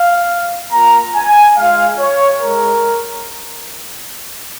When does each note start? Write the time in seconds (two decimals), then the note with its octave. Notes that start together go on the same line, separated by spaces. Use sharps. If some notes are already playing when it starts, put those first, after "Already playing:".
Already playing: F5
0.72 A#3 F4 A#5
1.15 G#5
1.57 G#3 F4 F5
1.99 C#5
2.42 G#3 A#4